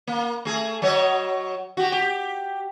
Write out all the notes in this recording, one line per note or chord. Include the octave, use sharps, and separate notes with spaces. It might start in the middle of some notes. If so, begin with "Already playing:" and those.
A#3
A3 G#4
F#3 C#5 D#5
F#4 G4
G4